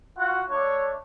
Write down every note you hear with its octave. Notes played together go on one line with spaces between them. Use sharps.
F4 F#4 F#5
A3 D4 C#5